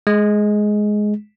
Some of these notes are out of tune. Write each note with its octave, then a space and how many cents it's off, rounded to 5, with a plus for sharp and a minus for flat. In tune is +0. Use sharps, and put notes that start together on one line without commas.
G#3 +10